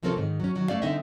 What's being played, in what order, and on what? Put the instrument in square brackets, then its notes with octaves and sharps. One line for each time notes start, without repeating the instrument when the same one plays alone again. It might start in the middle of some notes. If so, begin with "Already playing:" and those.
[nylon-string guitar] C3 F3 A#3 C4 C#4 A4
G#2 D#3
F#3 C#4
D#3 F#3
A3 C#4 D5 F5
D3 C4 D#4 D#5 E5